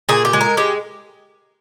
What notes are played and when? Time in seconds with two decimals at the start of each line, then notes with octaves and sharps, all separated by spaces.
0.09 A#2 G#4
0.25 G4
0.33 G#3
0.41 A#4
0.57 G#3 G4